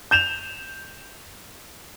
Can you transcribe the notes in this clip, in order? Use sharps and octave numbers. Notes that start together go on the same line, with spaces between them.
G6 E7 F7